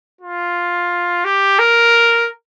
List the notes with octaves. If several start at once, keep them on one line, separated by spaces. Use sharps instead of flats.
F4
G4
A#4